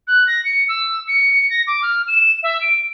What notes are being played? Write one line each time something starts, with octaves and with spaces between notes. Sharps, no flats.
F#6
A#6
C#7
E6
C#7
A#6
D6
F6
E7
E5
D7